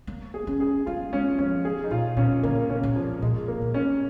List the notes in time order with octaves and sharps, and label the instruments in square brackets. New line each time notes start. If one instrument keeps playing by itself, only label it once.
[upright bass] A#3
[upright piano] G#4
[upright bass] C#4
[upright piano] G#4
[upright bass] A#3 [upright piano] F4
[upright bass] G#3 [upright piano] C#4
[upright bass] F3 [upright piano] C#4
[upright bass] C#3 [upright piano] G#4
[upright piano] D#4
[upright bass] A#2 [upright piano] F4
[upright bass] A#2 [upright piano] C#4
[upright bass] C#3 [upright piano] A#3
[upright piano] C#4
[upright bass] A#2
[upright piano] F3
[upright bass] A#2 [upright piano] G#3
[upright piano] A#3
[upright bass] A#2
[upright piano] C#4